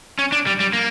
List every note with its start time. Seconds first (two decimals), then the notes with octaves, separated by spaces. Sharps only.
0.19 C#4
0.32 D4
0.47 G3
0.60 G3
0.73 A#3